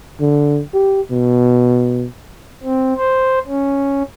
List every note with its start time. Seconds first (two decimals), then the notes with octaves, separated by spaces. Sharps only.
0.21 D3
0.74 G4
1.11 B2
2.63 C4
2.98 C5
3.47 C#4